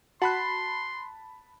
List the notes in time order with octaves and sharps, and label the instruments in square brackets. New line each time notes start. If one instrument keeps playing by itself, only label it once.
[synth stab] F#4 [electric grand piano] A5 B5 F#6 [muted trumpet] C6